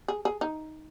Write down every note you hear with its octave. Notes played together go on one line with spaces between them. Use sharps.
G#4
G#4
D#4